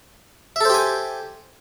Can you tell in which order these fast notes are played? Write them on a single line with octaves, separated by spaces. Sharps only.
E5 A4 C5 G4 G#5